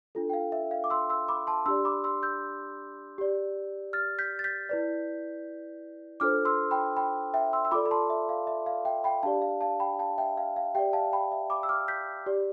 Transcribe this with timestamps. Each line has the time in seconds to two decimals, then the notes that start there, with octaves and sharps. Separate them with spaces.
0.15 D4 F4 A4
0.30 G5
0.33 F5
0.52 E5
0.71 F5
0.84 D6
0.90 C6 E6
1.10 C6 E6
1.29 B5 D6
1.47 A5 C6
1.66 D4 G4 D5 C6 E6
1.85 B5 D6
2.04 C6 E6
2.23 E6 G6
3.18 G4 D5
3.93 F6 A6
4.19 G6 B6
4.39 A6
4.44 G6 B6
4.69 E4 B4 D5
6.20 D4 F4 A4 C5 D6 F6
6.45 C6 E6
6.71 G5 B5
6.97 G5 B5
7.34 E5 G5
7.53 C6 E6
7.65 E6
7.71 F4 A4 D5 B5 D6
7.86 B5
7.91 A5 C6
8.10 E5
8.29 F5
8.47 E5
8.66 F5
8.85 E5 G5
9.04 G5 B5
9.23 D4 G4 D5 F5 A5
9.42 F5
9.61 F5 A5
9.80 G5 B5
9.99 F5 A5
10.18 E5 G5
10.37 F5
10.56 F5
10.75 G4 D5 E5 G5
10.93 F5 A5
11.13 G5 B5
11.32 E5
11.50 B5 D6
11.63 E6
11.69 D6 F6
11.88 G6 B6
12.26 G4 D5